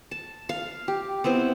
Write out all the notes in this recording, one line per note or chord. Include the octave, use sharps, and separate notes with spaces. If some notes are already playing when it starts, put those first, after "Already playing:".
A5
F5
G4
B3 C4 E4 C5